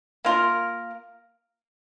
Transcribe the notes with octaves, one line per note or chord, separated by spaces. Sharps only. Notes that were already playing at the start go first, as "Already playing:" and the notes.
A#3 F4 A#4